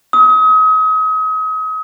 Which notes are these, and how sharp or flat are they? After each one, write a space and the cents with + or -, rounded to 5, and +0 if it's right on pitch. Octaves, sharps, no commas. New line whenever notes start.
D#6 +35